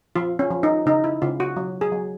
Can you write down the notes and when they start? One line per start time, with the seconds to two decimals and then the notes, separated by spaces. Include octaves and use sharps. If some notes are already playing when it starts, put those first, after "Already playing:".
0.16 F3 F4
0.39 C#4
0.51 F3
0.63 D#4
0.86 C#3 D#4
1.04 E4
1.22 C#3 F4
1.40 F#4
1.56 F#3
1.81 G#4
1.92 F#3